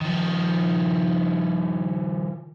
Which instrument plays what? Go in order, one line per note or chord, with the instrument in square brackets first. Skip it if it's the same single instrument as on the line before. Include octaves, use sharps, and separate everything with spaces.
[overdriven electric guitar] D#3 F3